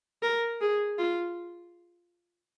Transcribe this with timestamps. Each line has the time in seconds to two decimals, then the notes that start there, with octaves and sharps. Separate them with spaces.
0.22 A#4
0.61 G#4
0.98 F4